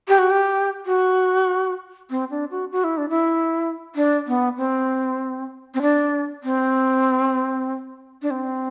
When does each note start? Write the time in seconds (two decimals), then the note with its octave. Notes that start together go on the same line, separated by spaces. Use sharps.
0.08 G4
0.18 F#4
0.30 G4
0.86 F#4
2.10 C4
2.30 D4
2.51 F#4
2.72 F#4
2.84 E4
2.97 D4
3.09 E4
3.95 D4
4.27 B3
4.57 C4
5.74 C4
5.81 D4
6.44 C4
8.22 D4
8.30 C4